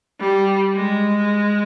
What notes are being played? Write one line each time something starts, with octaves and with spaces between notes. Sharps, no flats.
G3
G#3